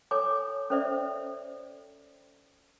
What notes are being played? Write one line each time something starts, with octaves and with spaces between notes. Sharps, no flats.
A4 C#5 G#5 D6
C#4 A4 C5 D5 E5